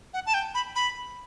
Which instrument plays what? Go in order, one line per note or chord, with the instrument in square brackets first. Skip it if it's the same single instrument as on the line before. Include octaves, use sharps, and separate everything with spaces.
[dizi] F#5
A5
G5
B5
B5